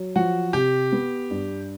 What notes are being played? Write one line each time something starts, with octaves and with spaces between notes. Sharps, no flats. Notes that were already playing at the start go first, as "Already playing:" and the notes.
Already playing: F#3
F3 F#4
C3 G4
B3
G2